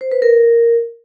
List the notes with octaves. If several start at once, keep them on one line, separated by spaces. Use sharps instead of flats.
C5
B4
A#4